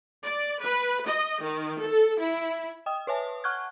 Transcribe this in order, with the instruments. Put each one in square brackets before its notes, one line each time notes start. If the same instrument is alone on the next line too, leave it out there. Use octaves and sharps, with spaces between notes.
[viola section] D5
B4
D#5
D#3
A4
E4
[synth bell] D#5 G5 D#6
B4 C#5 E5 G#5 A5
F#5 C#6 F6 F#6 G#6